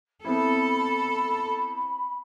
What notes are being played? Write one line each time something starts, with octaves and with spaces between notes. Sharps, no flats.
B3 C4 E4 A4 B5